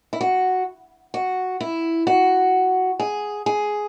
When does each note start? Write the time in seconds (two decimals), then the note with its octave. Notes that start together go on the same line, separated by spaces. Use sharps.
0.13 E4
0.21 F#4
1.14 F#4
1.61 E4
2.07 F#4
3.00 G#4
3.46 G#4